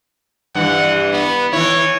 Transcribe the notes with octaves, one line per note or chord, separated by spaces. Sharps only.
G2 E3 F#5
B3
E3 E4 C#5